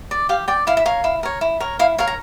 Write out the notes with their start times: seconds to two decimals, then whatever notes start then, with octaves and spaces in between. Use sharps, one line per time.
0.11 D5
0.29 G4 F5
0.48 D5 G5
0.67 E4 F5
0.77 E5
0.86 A#4 C#5 F5
1.04 E4
1.23 A#4 C#5
1.41 E4
1.60 A#4 C#5
1.79 E4 F5
1.98 A#4 C#5 F5
2.07 A#5